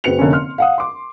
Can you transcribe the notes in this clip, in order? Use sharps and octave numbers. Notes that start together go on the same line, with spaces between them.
F#1 C4 F#4 B4 C#7 F7
F1 D3 A#3 C#4
C6 F6
F5 F#5 D#6
C6 D6